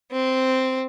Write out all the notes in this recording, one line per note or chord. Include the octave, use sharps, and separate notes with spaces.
C4